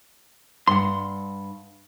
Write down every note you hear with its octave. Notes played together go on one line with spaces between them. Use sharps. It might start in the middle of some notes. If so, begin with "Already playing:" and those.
G2 F#5 C6